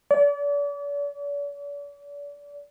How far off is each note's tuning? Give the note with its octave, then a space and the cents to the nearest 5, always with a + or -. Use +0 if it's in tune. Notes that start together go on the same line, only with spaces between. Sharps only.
D5 -40